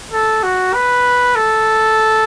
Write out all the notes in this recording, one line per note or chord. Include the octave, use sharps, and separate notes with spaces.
A4
F#4
B4
A4